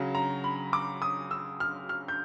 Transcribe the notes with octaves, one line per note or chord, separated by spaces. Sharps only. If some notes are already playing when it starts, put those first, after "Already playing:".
Already playing: C#3 F#3
A#5
B5
D6
D#6
E6
F6
F6
G6